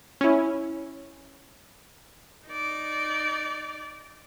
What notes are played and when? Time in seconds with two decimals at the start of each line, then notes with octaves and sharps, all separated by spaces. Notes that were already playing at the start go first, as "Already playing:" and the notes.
0.21 C#4 E4
2.48 D#4 D5